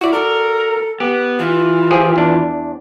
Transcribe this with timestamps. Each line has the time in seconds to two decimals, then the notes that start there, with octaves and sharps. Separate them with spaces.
0.01 E4 F#4 D5
0.13 A4 A#4
1.00 B3 G4
1.39 E3 F4
1.91 F3 G4 G#4
2.16 E2 D4